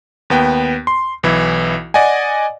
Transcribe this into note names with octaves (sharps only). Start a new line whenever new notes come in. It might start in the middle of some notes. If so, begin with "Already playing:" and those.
D#2 B3 G5
C6
B1 E3 E4
D5 D#5 F#5 G#5